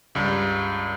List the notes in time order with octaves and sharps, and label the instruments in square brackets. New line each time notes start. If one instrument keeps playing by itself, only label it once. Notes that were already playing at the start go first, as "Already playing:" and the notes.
[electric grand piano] C#2 G2